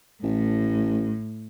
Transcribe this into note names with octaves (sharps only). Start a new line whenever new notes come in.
A1 A2